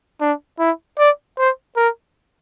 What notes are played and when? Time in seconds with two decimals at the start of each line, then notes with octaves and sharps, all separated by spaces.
0.21 D4
0.59 E4
0.98 D5
1.38 C5
1.76 A#4